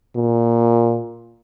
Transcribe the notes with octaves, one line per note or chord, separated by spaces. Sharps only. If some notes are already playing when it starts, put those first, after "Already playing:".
A#2